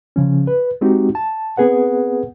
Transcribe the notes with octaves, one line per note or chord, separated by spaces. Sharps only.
C#3 F3 C#4
B4
G#3 C4 D#4 F#4 G4
A5
B3 C4 G#4 B4 F#5